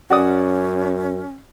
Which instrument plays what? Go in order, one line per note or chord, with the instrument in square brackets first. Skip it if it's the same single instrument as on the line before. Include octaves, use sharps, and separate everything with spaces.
[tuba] F#2 [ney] C#4 [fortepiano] F#4 D5 D#6